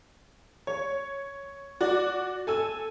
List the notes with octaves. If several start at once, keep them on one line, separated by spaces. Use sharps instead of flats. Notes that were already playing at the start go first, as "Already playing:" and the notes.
C#5
F#4 D5
A4 G#5 E6